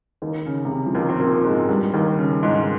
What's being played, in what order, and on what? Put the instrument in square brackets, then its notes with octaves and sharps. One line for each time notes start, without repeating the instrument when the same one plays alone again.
[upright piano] D#2 D#3
C#3
C3
C#3
F3
D#2 D#3
C4
A#2 A#3
G#2 G#3
G2 G3
D#2 D#3
C#3
G#2 G#3